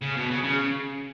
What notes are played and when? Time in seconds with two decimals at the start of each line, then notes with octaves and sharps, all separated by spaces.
0.02 C#3
0.16 B2
0.31 C#3
0.44 C#3